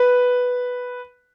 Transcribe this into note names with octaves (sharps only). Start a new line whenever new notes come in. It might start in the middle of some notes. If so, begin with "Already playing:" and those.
Already playing: B4